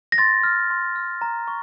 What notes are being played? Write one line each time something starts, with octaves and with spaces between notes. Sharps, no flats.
A#6
C6 A6
F6
C6
F6
A#5
C#6